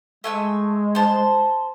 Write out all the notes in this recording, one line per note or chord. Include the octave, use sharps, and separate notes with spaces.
G#3 A3 G#5 E6
C5 A5